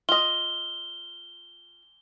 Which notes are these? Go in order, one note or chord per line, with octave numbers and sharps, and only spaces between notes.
F4 D#5 G7